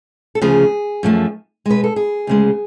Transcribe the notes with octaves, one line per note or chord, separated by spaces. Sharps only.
A4
D2 C#3 F3 G#4
F#2 F3 A3
B2 G#3 B4
A4
G#4
D2 C#3 G#3